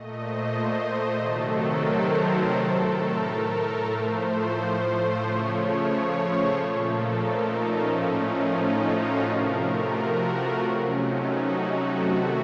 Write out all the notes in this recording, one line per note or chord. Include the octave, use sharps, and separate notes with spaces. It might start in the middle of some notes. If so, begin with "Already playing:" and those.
Already playing: A#2 A3 D#5
C5
C3 D#3 F#3 A3 A4
A#4
C5
A4
A2 A3 A4
A#4
A#4
A2 F3 A3 C5
C#3 F3 A3 C#5
C#5
C5
A#2 F3 A3 A4
A#4
D#4
C#4
A2 F3 A3 C#4
D#4
F4
F#4
C3 F3 A3 A#4
A#4
F#4
F4
C3 F#3 A3 C#4
D#4
F#4
F#4
C3 D#3 A3 F#4